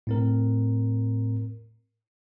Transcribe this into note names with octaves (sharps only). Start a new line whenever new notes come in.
A2 C4 A#4